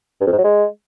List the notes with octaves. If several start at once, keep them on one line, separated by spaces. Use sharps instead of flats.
G2
F2
G#2
F#3
G#3